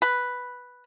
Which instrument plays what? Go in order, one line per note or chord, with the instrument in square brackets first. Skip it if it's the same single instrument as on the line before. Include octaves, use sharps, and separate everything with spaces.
[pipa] B4